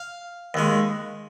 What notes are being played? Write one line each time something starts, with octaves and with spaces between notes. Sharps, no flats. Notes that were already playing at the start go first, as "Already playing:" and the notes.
Already playing: F5
D#2 D#3 G#3